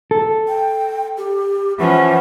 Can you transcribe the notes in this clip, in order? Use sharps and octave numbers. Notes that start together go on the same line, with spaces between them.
A4
G5
G4
E3 F3 C#4 F#5